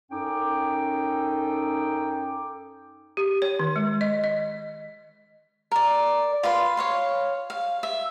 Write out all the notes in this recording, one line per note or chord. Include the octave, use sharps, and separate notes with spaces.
F#2 C#4 D#4 A4 G5 D6
G4
C#5
D#3
G#3
D#5
D#5
A#4 D5
F4 B4 F5 C6
C#5 F5 C6
F5
E5